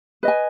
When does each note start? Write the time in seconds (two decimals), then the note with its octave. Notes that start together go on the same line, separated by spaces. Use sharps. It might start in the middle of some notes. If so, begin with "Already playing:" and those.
0.23 B4 D#5 G#5